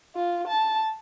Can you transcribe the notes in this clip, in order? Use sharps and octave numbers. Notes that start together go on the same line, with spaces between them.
F4
A5